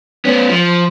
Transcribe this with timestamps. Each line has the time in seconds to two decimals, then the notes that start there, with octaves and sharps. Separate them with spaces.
0.25 B3 C#4
0.49 F3